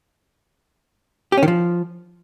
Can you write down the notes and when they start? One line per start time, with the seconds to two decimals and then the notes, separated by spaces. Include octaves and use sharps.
1.32 G4
1.37 C#4
1.43 D#3
1.48 F3